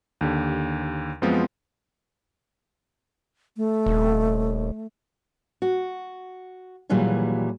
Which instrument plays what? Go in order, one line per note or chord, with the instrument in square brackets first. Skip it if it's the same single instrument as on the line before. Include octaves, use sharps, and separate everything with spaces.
[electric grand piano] D#2 D3 G4
F#2 F3 G#3 B3 C4 F4
[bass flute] A3
[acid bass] D#1
[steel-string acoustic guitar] F#4
D#2 A#2 E3 F#3 G3 G#4